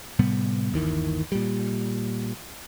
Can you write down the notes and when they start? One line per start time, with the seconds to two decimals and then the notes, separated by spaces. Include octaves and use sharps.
0.19 A2 C3 G3 B3
0.72 G1 D#2 D#3 E3
1.32 A#2 G3